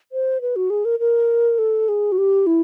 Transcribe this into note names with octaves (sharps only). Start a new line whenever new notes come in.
C5
B4
F#4
G#4
A#4
A#4
A4
G#4
F#4
G4
E4